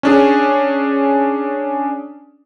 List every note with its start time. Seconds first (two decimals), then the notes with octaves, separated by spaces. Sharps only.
0.03 C#4 D4 G#4